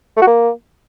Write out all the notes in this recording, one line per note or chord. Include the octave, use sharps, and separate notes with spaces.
A3
F#4
A#3